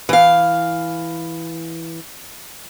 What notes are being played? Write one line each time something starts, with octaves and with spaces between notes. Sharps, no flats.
E3 F5